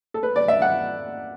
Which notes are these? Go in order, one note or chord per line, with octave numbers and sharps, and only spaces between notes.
A4
B4
D5
E5
F#5